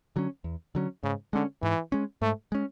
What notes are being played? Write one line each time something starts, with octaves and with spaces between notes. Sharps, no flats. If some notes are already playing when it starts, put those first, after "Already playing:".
D3 F#3 C#4
E2
D3 F#3 C#4
G#2 C#3
D3 G#3 C#4
G#2 E3
G#3 C#4
G#2 A3
G#3 C#4